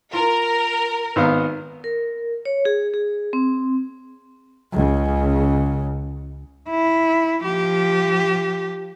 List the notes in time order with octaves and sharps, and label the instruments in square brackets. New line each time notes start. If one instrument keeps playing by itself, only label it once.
[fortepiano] F4 [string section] A#4
[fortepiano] G#1 B3 F5
[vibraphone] A#4
C#5
G#4
G#4
C4
[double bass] C#2 C#3
[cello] E4
F3 G4